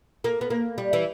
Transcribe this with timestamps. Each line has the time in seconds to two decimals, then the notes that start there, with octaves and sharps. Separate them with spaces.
0.24 A#3
0.41 B3
0.50 A#3
0.78 G3
0.93 E3